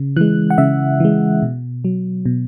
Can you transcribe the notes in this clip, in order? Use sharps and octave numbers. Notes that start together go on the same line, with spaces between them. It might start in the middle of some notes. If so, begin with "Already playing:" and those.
Already playing: C#3
E3 G#3 F#6
F#5
C#3 E5
E3 G#3
B2
F#3
B2